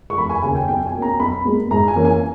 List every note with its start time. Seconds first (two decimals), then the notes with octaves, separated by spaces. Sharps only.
0.10 C#6
0.17 E1 B5
0.29 G#5
0.43 D#2 C#3 G#5
0.55 G5
0.68 B1 G5
0.86 G#5
0.94 B2 A#3 C#4
1.02 A#5
1.20 B1 B5
1.45 A#2 G#3 B3
1.71 G#2 A#5
1.88 G#5
1.96 E3 A#3 C#4
2.05 G#5